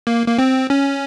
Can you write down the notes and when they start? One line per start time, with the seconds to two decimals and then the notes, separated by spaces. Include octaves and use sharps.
0.07 A#3
0.27 A#3
0.38 C4
0.70 C#4